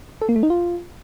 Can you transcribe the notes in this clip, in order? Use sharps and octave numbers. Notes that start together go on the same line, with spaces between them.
A4
A#3
A3
D#4
F4